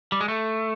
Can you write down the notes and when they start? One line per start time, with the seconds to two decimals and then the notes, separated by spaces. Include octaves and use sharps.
0.12 G3
0.21 G#3
0.28 A3